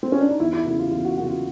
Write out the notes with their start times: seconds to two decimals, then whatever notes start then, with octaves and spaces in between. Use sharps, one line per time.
0.03 C4
0.12 C#4
0.21 D4
0.31 D#4
0.40 E2 E4
0.53 E4
0.66 C#3 F#3 A#3 E4
0.79 F4
0.91 E2 F4
1.05 F#4
1.17 C#3 F#3 A#3 F#4
1.30 F4